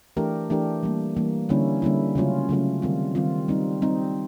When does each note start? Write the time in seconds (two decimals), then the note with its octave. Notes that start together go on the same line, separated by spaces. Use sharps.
0.17 E3 A3 D4 G4 A#4
0.50 E3 A3 D4 G4 A#4
0.83 E3 G3 A#3
1.16 E3 G3 A#3
1.49 D3 G3 A#3 C#4 E4
1.82 D3 G3 A#3 C#4 E4
2.15 C#3 F#3 A3 C#4 F4
2.49 C#3 F#3 A3 C#4 F4
2.82 D#3 G3 C4 F4
3.15 D#3 G3 C4 F4
3.48 G3 C4 D#4
3.82 G3 C4 D#4